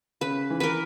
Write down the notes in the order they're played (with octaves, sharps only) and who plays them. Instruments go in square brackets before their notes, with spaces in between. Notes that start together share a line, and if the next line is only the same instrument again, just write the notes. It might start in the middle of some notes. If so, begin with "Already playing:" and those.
[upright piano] C#3 [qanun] B4
[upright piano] E3
[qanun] A#4 B4